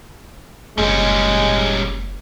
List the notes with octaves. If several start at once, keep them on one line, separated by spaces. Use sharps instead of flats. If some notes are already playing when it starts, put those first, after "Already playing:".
F#1 G3 G#3 C#4